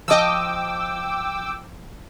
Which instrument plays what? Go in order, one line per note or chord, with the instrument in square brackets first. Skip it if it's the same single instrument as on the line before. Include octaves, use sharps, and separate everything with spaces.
[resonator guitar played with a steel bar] F3 D#5 [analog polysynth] G5 D6 E6